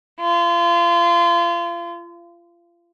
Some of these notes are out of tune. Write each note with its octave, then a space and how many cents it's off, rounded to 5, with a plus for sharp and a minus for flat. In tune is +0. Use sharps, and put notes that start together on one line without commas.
F4 -30